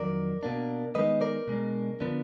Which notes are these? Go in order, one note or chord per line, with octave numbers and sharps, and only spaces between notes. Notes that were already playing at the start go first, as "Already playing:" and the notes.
Already playing: F2 D#3 F#3 A#4 D5
B2 A#3 D4
D#3 G#3 B3 D#4 B4 D#5
A#4 D5
B2 G#3 D4
D3 F3 B3 D4